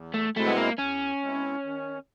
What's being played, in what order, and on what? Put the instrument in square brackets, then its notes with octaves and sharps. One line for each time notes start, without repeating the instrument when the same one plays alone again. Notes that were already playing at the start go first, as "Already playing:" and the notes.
Already playing: [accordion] E2
[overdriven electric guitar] A3
[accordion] B2 G#3 C4 E4 [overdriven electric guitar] A3
[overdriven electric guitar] B3
A#3
[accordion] E2 [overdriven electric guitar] C#4
[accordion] B2 G#3 C4 E4
D#3